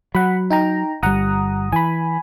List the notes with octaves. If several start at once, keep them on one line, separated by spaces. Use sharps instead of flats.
F#3 F#5 B5
D#4 G5 A#5
G1 G3 F#5 A#5 D#6
E3 G#5 B5